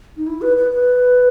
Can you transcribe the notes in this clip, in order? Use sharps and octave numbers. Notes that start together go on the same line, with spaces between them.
D#4
E4
B4
B4
B4